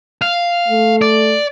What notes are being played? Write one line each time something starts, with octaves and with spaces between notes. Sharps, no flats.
F5
A3
D5